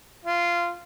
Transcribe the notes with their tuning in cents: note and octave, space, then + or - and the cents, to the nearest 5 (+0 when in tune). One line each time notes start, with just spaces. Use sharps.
F4 -15